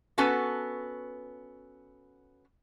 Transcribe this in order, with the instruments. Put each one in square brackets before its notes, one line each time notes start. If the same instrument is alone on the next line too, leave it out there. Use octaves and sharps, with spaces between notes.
[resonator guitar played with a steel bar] B3 C#4 F#4 A4 B4